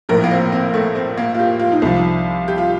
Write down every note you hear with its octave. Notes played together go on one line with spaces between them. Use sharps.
A#1 A2 F3 A#4
A#3
C4
C4
A3
C4
A#3
F4
G4
F4
D#4
C2 C3 F3 F4
G4
F4